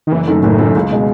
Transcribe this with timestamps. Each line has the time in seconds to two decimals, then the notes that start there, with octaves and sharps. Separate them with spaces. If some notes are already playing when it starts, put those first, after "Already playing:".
0.07 D#3
0.12 F#1 E3
0.28 F#2 D#3 A3
0.43 F#1 A2
0.59 F#2 D#3 A3
0.75 C#2
0.91 B2 G#3